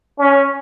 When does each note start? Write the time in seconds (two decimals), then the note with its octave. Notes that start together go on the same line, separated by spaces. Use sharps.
0.19 C#4